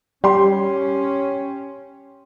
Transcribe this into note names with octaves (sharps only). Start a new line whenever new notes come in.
G3 C#4 G4 C6